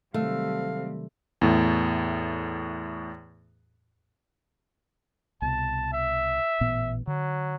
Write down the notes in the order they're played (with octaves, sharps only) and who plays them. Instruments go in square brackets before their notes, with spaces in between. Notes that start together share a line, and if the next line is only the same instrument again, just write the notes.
[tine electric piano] C3 D#3 F#3 [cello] G3 C4 [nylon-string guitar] A3 [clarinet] F5
[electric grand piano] E2 A2
[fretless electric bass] C2 B2 [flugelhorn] A5
[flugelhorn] E5
[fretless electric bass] A1 A#2 B3
[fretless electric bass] D3 [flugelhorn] F#3